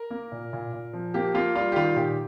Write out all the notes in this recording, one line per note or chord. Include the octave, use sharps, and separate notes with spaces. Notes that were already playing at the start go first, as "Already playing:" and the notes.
Already playing: A#4
A#3
A#2
A#2
A#2
F3
A#3 G4
A#3 F4
G3 F4
G4
D#3 F4
A#2 G4